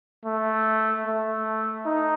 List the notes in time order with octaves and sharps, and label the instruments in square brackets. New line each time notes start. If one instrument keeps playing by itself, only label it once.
[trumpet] A3
A3
D#4